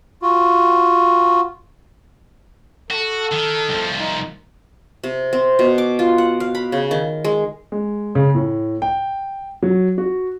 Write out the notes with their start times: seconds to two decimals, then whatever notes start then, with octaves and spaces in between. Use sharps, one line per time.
0.22 F4 F#4
2.91 F#4 A4
3.32 D#3
3.69 C2 F3
3.99 D#4
5.04 C3
5.33 C4
5.59 B2
5.78 D6
5.99 F4
6.18 F#5
6.40 F5
6.55 B5
6.72 C#3
6.91 D#3
7.25 G#3
7.72 G#3
8.15 C#3
8.35 A2
8.82 G5
9.63 F#3
9.98 F#4